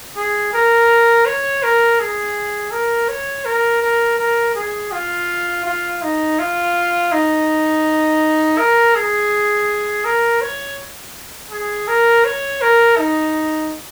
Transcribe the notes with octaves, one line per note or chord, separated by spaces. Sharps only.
G#4
A#4
C#5
A#4
G#4
A#4
C#5
A#4
A#4
A#4
G#4
F4
F4
D#4
F4
D#4
A#4
G#4
A#4
C#5
G#4
A#4
C#5
A#4
D#4